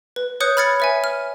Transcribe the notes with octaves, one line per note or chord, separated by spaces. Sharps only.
B4
B4 C#5 D#6 F#6 G6 C#7
B5 F6 G#6 A6 C#7
B4 E5 G#5
F6